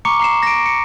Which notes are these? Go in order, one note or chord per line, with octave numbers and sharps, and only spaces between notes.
A#5 C#6 D6 C#7
A#5 C7 E7
A#6 D7
C#7